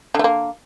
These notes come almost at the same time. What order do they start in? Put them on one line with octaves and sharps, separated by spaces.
D3 A3 A#3